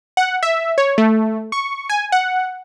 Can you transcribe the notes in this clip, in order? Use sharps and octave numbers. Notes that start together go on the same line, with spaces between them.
F#5
E5
C#5
A3
C#6
G#5
F#5